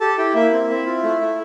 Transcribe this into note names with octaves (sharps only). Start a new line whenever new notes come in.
G4 A4 A5
E4 G4 G5
A#3 E4 E5
C4
C4
F4
A3
A3